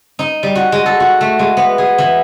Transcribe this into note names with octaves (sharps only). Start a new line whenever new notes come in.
D#4
G3
F#4
G#3
A4
F#4
A3
G#3
B3
G#4
E3